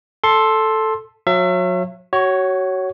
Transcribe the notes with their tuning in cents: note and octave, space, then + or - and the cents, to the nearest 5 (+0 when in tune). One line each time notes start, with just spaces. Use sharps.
A4 +0 C6 +10
F#3 -30 E5 +35
F#4 +25 C#5 +0